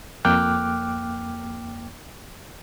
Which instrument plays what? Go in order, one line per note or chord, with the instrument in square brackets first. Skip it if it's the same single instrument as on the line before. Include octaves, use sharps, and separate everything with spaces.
[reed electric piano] F2 A#3 G5 D6 F6 F#6